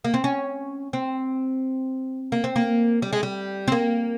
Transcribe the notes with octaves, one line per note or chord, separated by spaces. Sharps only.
A#3
C4
C#4
C4
A#3
C4
A#3
G3
G#3
G3
C4
A#3